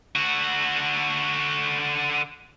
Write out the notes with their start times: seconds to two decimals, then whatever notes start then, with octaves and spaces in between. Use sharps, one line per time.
0.15 D3 F#4